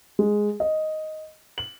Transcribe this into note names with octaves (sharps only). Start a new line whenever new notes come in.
G#3
D#5
F#7